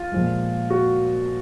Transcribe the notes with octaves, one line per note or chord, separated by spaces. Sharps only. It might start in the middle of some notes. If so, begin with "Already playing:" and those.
Already playing: F4
A#2 F3 G#3
F#4